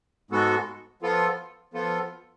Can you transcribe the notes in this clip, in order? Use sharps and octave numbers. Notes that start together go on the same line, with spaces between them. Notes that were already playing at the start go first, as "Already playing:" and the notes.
G#2 G#3 B3 F#4 A4
F3 B3 F4 A4
F3 B3 F4 A4